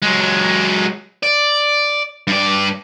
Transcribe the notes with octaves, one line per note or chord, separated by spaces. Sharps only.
F#3 G#3
D5
G2 D5